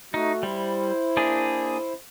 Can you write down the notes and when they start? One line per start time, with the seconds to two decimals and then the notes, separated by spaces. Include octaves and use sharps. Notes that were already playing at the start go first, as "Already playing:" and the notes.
0.14 A3 D#4 F#4
0.43 G3 E4 C5
1.17 A#3 D4 G#4